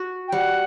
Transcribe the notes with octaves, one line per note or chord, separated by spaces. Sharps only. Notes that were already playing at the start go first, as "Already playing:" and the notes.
Already playing: F#4
G5
G3 F#5